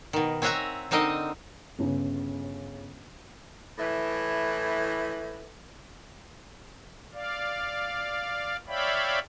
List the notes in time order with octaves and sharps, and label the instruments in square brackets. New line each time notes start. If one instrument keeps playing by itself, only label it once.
[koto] B2 D#3
C4 C#5 E5 F#5 G#5 A#5
D3 C4 D#4 A#4 D#5
[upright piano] G1 C#3
[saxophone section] A2 E3 B4 E5
[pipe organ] D5 F5
C#5 D5 E5 F5 G5 B5